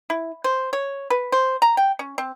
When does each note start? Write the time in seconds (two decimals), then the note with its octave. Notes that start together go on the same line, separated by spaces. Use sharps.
0.10 E4
0.44 C5
0.73 C#5
1.10 B4
1.32 C5
1.62 A#5
1.77 G5
1.99 C#4
2.18 C4